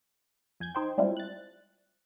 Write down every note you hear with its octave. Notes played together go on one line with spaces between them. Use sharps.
F2 G#5 G6 G#6
D#4 C5 G5
G3 G#3 C4 D4 E4 F4
F#6 A6